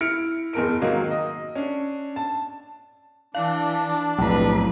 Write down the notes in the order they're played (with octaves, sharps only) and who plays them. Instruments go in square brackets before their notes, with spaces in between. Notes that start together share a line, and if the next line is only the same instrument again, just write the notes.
[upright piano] E4 F6 C#7 D7
F#1 E2 A#4 D7
G#2 D#3 F#3 A#3
D#5
C#4 D4
A5
[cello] E3 [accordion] D4 [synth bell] F5
[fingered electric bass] B1 A2 [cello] F2 B4 [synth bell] F#3 A#5